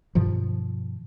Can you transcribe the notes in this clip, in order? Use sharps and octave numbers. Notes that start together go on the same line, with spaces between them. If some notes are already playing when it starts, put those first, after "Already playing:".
G2 B2 D#3 F3